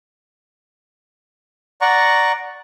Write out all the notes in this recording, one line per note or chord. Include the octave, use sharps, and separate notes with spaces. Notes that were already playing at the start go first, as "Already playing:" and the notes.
D5 F#5 A#5 C#6